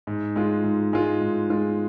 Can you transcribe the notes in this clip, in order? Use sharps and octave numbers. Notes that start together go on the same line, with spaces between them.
G#2
G#3 F4
G#2
G#3 F4
G#2
G#3 F4